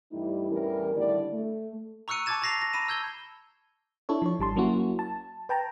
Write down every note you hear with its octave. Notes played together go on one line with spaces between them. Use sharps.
G2 E3 G3 A3 D#4 E4
E2 A2 E3 G3 C#4 A#4
A2 D3 D#3 G3 E4 D5
A3
A#5 C#6 E6 F#6 C#7 D#7
A5 C#6 D6 G#6 A6 E7
A5 A#5 A#6 C7 F7
A#6
A#5 B5 A#6 D#7 E7
E6 G6 G#6 G7
D4 E4 A4 C#5
F3 C#5
G#1 G3 A5 C6
F#3 A#3 C#4 E4 F#4
A5
B4 G5 A5 A#5